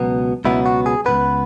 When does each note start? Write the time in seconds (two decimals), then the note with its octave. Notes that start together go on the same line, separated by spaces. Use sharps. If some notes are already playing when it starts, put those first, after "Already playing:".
Already playing: C#2 B2 F#3 B3
0.45 C#2 B2 F#3 B3 E4
0.66 F#4
0.86 G#4
1.06 C#2 B2 B3 B4